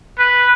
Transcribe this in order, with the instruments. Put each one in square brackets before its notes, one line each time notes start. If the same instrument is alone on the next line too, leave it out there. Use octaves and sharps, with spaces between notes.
[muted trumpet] B4